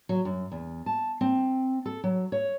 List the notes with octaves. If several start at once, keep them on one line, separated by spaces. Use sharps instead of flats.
F#3
F#2
E2
A5
C4
A4
F#3
C#5